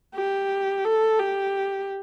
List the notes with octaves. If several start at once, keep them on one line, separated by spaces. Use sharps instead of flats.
G4
A4
G4